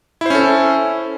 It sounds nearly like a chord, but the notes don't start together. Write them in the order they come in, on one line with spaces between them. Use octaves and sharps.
E4 C5 C#4 A4